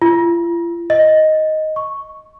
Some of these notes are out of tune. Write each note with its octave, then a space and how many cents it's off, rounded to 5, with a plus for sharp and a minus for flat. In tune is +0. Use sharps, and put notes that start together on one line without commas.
F4 -45
D#5 +5
C#6 +0